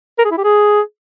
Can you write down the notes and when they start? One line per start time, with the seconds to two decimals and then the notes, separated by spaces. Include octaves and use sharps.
0.18 A#4
0.25 G#4
0.31 E4
0.38 G4
0.44 G#4